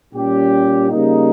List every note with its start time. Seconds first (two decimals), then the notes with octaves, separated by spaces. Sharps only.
0.13 A#2 G3 C#4 G4
0.90 C#3 G3 A#3 D#4